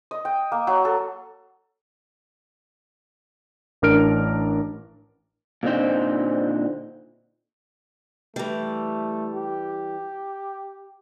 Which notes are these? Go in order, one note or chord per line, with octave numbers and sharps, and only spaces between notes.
D#5
G5
A#3
F#3
A4
A1 D4 A#4 F6 D7
A#2 D3 C4 D#4 C5
E3 G3 A3
G4